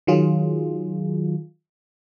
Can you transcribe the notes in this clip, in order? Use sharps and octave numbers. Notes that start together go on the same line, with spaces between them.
D#3 F#3 F4 G#4